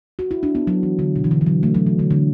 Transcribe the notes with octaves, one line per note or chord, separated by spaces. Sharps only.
F#4
E4
D4
B3
F#3
E3
D3
B2
E3
D3
E3
F#3
A3
F#3
E3
D3
D3